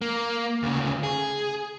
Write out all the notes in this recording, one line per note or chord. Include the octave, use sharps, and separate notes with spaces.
A#3
D2 C#3
G#4